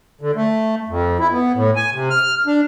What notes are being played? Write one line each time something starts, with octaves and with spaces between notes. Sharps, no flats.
D3
A3
F2
E4
B3
A2
G#5
C3
F6
D4